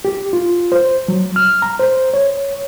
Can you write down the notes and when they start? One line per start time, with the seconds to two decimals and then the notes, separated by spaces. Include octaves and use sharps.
0.05 G4
0.33 F4
0.72 C5
1.08 F#3
1.36 F6
1.62 A#5
1.79 C5
2.14 C#5